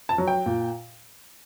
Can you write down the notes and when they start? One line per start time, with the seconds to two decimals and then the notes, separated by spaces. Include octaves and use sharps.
0.09 A5
0.18 F#3
0.28 G5
0.46 A#2